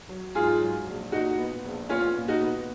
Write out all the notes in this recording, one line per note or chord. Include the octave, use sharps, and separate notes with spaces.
F#3
G#2 F4 G#4
F#3
A#1
A#2 D#4 F#4
B3
A#1
B3 C#4 F4
A#2
D#4 F#4
B3